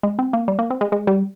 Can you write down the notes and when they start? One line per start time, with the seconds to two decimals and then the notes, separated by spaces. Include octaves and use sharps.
0.03 G#3
0.19 C4
0.33 A#3
0.48 G3
0.59 A#3
0.70 C4
0.81 G#3
0.92 G#3
1.07 G3